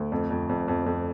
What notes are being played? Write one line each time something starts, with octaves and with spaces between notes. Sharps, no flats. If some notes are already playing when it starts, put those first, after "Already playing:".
Already playing: D2
F2
F2
F2
F2
F2